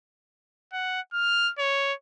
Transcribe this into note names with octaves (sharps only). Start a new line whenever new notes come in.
F#5
F6
C#5